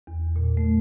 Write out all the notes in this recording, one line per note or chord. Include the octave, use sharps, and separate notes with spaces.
E2
A#2
A3